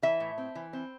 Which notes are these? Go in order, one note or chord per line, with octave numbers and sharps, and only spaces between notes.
E3 E5
A2
C4
E3
C4